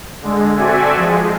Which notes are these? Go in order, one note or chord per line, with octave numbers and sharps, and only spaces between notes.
D3 G#3
C4 F#4 A4 D5 E5 G#5
F3 G#3